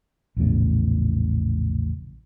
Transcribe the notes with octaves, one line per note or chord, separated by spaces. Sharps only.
A#1 E2 A2 C#3